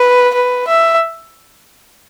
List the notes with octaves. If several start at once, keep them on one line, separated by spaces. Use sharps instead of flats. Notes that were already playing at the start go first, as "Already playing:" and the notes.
Already playing: B4
B4
E5